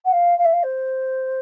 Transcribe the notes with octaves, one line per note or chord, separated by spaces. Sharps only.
F#5
F5
F5
E5
F5
C5